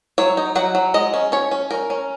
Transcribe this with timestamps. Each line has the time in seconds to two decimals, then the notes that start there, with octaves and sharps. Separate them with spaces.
0.18 F#3 C#5
0.37 D#4
0.56 F#3 F#5
0.75 F#3
0.94 G#3 D#5
1.14 C#4
1.32 C#4 C#5
1.51 C#4
1.71 C#4 A#4
1.90 C#4